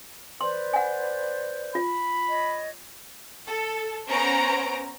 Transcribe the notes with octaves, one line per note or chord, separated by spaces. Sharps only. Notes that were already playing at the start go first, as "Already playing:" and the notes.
B4 C5 D5 C6
F#5 G#5
F4 B5
C#5 D#5
A4
B3 C#4 C5 A#5 D7